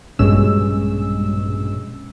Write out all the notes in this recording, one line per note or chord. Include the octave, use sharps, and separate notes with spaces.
A#1 G2 B2 G#3 C#4 E6